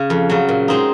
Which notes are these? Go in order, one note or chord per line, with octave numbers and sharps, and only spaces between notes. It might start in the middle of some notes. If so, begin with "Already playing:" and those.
Already playing: C#3
F2
C#3 F#3
A#2
G#3 C4 D#4